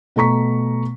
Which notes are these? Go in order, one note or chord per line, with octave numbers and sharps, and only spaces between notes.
B2 A3 A#5 C#6 B6